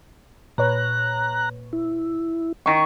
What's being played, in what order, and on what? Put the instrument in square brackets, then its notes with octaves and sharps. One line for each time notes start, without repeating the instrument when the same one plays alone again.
[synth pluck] A#2 B4 C#5 [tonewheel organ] A#5 F#6
[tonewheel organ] E4
[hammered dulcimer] D#3 C#6